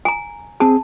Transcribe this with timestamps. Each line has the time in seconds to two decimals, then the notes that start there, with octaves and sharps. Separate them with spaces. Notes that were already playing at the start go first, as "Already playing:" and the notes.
0.05 G#5 A#5
0.60 C4 G#4 A5